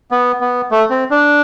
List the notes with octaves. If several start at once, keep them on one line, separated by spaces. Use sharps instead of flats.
B3
B3
A3
C4
D4